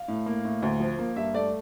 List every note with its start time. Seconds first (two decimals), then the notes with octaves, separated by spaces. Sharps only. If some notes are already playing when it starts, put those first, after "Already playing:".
Already playing: F5
0.08 A2
0.26 A#3
0.45 A2
0.62 D2
0.80 F3
0.99 A#3
1.16 G2 E5
1.34 A3 D5